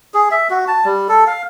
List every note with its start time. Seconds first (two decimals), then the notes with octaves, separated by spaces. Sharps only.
0.14 G#4
0.31 E5
0.50 F#4
0.68 A5
0.85 G3
1.09 A4
1.27 F5